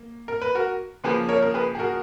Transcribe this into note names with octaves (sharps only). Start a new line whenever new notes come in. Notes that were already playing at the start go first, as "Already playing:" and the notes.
Already playing: A#3
A#4
B4
F#4 A#4
C#3 F3 A#3 G#4 B4
A#4 C#5
A#4
G#4 B4
G#4
F#4 A#4